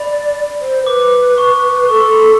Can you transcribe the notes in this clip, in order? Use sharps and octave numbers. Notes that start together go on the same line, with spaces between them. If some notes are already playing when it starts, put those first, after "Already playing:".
Already playing: D5 B5
C5
B4 D6
C#6
A4 C#6
C6
B5
C6